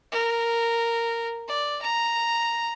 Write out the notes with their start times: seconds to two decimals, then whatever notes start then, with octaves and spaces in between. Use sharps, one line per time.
0.12 A#4
1.48 D5
1.82 A#5